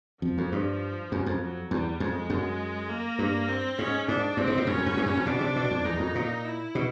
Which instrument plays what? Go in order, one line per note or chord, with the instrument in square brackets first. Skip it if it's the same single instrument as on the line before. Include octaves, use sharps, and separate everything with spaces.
[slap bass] F2 [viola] F3
[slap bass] F2
G2
F#2
F2
[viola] F#3
[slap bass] E2 [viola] G3
[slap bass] F2 [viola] G#3
[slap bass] F#2
[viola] A#3
[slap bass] G2
[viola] C4
[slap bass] G#2 [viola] C#4
[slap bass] G#2 [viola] D4
[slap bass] G2 [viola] C4
[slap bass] G#2
A2
[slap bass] F#2 [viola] C#4
[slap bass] F2
F#2
G2
F#2
F2
[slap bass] B2 [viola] D4
[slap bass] C3
B2
F2
[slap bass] E2 [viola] D#4
[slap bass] F2
A#2
[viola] E4
[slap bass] B2